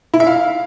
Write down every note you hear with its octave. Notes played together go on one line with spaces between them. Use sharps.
E4
E5
F5